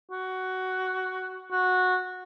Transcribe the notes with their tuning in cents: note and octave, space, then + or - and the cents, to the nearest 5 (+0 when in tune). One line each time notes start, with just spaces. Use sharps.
F#4 +10
F#4 -15